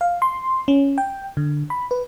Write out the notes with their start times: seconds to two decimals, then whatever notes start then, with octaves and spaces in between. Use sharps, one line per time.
0.01 F5
0.22 C6
0.68 C#4
0.98 G5
1.37 D3
1.70 B5
1.91 B4